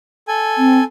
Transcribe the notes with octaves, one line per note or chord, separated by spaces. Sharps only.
A4 G#5
C4